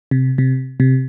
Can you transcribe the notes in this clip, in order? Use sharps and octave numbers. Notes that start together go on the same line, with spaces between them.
C3
C3
C3